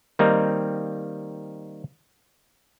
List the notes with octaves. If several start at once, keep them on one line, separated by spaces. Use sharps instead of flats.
D#3 G3 A#3 C4 D#4